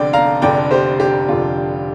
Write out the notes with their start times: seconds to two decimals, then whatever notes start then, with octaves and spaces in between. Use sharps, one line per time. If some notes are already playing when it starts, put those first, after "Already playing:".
Already playing: F1 F2 D3 D5 G5
0.13 F5 A#5
0.42 F1 F2 D3 D5 G5
0.71 G4 C5
1.00 G4
1.28 F1 F2 D3 F4